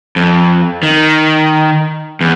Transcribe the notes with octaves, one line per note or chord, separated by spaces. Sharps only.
F2
D#3
E2